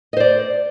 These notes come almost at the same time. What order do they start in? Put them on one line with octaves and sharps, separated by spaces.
D#5 C5 D5